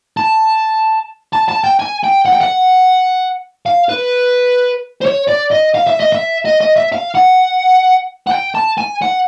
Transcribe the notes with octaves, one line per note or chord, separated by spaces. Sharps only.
A5
A5
A5
G5
G#5
G5
F#5
G5
F#5
F5
B4
C5
C#5
D5
D#5
F5
E5
D#5
E5
D#5
D#5
E5
F5
F#5
F#5
G5
A5
G#5
F#5